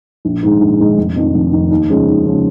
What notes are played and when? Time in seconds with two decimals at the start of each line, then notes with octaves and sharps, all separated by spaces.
0.25 A#1
0.43 G#2 D#3 G#3
0.61 A#1
0.79 G#2 D#3 G#3
0.97 F1
1.16 F2 D#3
1.34 F1
1.53 F2 D#3
1.71 D#2
1.89 C#3 F3 G#3 C#4
2.08 D#2
2.26 C#3 F3 G#3 C#4